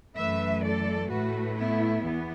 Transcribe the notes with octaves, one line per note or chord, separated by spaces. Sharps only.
F#2 E3 A3 B4 E5
A4 D5
A2 A3 F#4 B4
B3 E4
E2 E3 B3